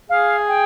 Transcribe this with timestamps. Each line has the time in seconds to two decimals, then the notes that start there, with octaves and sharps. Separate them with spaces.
0.10 G#4 F5
0.48 G5